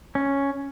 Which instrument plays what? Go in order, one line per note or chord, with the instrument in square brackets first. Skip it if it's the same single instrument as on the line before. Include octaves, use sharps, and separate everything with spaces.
[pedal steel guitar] C#4